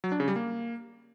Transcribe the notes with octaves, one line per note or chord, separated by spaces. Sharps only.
F#3
D4
C#3
G3
A#3